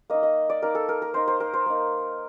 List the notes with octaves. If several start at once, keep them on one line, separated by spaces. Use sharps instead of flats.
A#3 D#4 D#5
D#5
D5
A#3 D#4 A#4
A4
A#4
A#4
A#3 D#4 C5
C5
A#4
C5
A#3 D#4